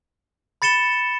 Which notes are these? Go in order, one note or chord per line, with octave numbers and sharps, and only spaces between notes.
B5 A6 C#7 E7 G7